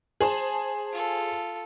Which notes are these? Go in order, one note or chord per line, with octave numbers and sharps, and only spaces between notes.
G#4 C5 A5
F4 A4